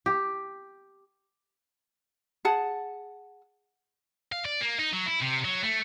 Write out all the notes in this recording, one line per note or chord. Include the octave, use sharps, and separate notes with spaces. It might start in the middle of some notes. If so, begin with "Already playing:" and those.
G4
G#4 F#5 A5
F5
D5
A#3
D#4
F#3
E4
C3
F#3
A3